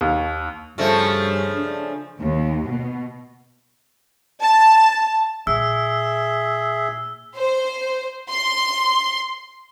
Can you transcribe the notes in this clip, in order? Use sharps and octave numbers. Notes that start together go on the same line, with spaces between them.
D#2
G2 C#3 F3 A3
D4
D#2
B2
A5
A#2 G#4 E5 E6
C5
C6